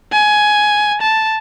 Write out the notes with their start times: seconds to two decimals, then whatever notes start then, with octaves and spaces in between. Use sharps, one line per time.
0.12 G#5
1.02 A5